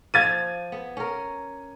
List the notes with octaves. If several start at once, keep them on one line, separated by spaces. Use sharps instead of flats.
F3 C5 G#6 A6 D#7
B3
C#4 A#4